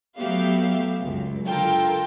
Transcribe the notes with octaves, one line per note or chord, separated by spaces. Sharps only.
F#3 A3 B3 G4 E5 F5
C#2 F#2
D3 F4 A4 A#4 G5